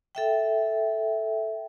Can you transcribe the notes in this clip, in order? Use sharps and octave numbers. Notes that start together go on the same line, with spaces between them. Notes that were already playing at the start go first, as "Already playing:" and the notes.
A4 E5 G5